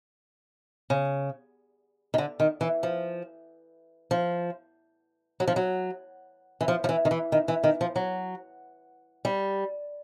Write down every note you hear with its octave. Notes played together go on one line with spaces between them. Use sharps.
C#3
D#3
D3
D#3
E3
F3
F3
F#3
F3
F#3
E3
F3
F3
E3
D#3
E3
D#3
E3
D#3
F3
F#3
G3